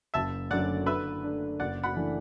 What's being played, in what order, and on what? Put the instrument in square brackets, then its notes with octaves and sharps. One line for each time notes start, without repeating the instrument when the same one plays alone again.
[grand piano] F#1 [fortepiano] E5 A5
[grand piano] F#2 D3 F#3 A3 [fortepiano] D5 F#5
[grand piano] D3 [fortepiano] B4 E5
[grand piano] A3 D4
[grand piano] F#1 [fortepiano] D5 F#5
[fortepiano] F#5 B5
[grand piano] E3 A3 D4